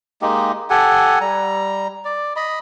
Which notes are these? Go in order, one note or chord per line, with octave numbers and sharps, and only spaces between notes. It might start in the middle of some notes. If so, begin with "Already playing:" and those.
G#3 A#3 D#4 G4
G4 A4 F#5 G#5
G3 A#5
D5
D#5 B5